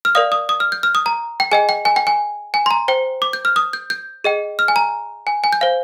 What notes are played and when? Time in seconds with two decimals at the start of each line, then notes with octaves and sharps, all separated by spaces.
0.05 F6
0.15 A#4 D5 F5 D#6
0.32 D#6
0.49 D#6
0.60 F6
0.72 G6
0.83 F6
0.95 D#6
1.06 A#5
1.40 G5
1.52 G#4 D#5 G5 G#5
1.69 G5
1.85 G#5
1.96 G5
2.07 G#5
2.54 G#5
2.66 C6
2.71 A#5
2.88 C5 G5
3.22 D6
3.33 G6
3.45 F6
3.56 D#6
3.73 G6
3.90 G6
4.24 G#4 D#5 G5
4.59 F6
4.68 G#5
4.76 A#5
5.27 G#5
5.44 G#5
5.53 G6
5.61 C5 F5